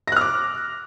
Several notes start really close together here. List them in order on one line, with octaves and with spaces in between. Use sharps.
A#6 F#6 F6 D6